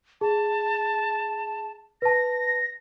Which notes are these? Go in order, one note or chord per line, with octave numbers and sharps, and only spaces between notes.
G#4 A5
B4 A5 A#6